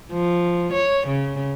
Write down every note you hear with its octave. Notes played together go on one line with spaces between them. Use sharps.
F3
C#5
C#3